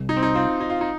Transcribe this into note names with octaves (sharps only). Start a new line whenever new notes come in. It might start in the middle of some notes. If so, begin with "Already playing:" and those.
Already playing: C2
D#4
C4
D#4
C4 F4
D#4
F4
D#4